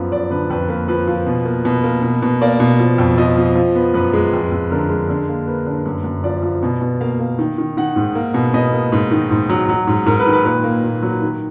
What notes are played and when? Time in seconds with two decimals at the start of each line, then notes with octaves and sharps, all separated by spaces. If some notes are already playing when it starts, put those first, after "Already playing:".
Already playing: F#2 F3 B3
0.12 F#2 D5
0.30 D3 B4
0.50 F2 B4
0.69 A#3 B4
0.88 F3 B4
1.08 F3
1.27 B2
1.45 A#3
1.65 B2
1.84 A#3
2.03 B2
2.22 B2
2.41 A#3 D5
2.60 B2
2.80 F3
2.98 F2
3.18 F3 D#5
3.37 F3
3.55 F3
3.75 B3
3.94 F#2 B4
4.13 G#3
4.33 F2
4.51 F2
4.71 D3 A#4
4.90 G#3
5.09 D3
5.29 A#3
5.47 A#3 B4
5.66 D3
5.86 F#2
6.04 F#2
6.24 F3 D5
6.43 F3
6.63 B2
6.81 B2
7.01 A#3 F5
7.20 A#3
7.39 D#3
7.58 D#3
7.77 D#3 F#5
7.96 G#2
8.15 A#3
8.34 B2
8.54 B2 D#5
8.73 A#3
8.92 G#2
9.11 D#3
9.31 G#2
9.49 F#3
9.69 F#3
9.87 G#2
10.06 G#2 A#4
10.19 B4
10.26 D#3
10.33 B4
10.45 A#2 B4
10.64 A#3
10.83 A#2
11.03 F#3
11.22 D#3